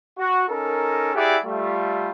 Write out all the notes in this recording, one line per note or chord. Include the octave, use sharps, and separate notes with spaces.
F#4
C#4 D#4 A4 A#4
E4 G4 G#4 D5 E5 F#5
G3 A3 F4